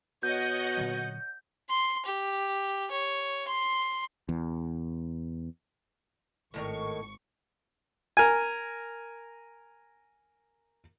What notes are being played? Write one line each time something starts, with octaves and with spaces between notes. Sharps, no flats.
B2 C#5 D#5 F#5 G6
A#2 D3 F#3
C6
G4
C#5
C6
E2
G#1 A2 D#3 A#4 C#6
A#4 G#5